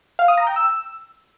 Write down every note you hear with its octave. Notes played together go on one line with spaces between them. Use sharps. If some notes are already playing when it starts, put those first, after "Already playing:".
F5
D#6
A#5
G5
E6